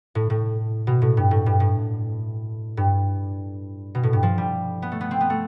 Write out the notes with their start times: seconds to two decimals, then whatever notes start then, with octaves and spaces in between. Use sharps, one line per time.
0.15 A2
0.30 A2
0.87 B2
1.02 A2
1.17 G2
1.31 A2
1.46 G2
1.60 A2
2.77 G2
3.95 B2
4.03 A2
4.13 G2
4.23 F3
4.38 G3
4.82 B3
4.92 A3
5.01 B3
5.11 C4
5.21 B3
5.30 A3